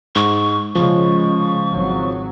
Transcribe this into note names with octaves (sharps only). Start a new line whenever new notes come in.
G#2 C#6
C#3 F3 G#3 C#6
G#1 F#3